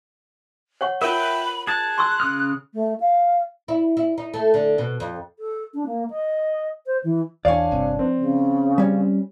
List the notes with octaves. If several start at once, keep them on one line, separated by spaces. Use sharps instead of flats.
C#5 F#5 C#6
F4 A#4 E5 G5 B5
G#4 A5 F#6
C6 C#6 E6
C#3 D#6 F6
A3
F5
E4
E4
D#4
A3
D3
B2
F2
A4
D4
A#3
D#5
C5
E3
E2 D4 C#5 D5 F5 G#5
G1 C3
F3 C4
C#3
G3 C#4